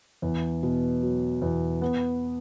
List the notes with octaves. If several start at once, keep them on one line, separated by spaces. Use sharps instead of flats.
E2
B2
F#3
E2
B3